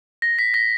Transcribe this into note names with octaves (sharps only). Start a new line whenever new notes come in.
A#6
B6
A#6